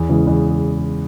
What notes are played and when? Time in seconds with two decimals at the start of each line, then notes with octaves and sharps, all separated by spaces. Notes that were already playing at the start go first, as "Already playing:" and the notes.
Already playing: E2
0.09 C#3 E3 G#3
0.27 E2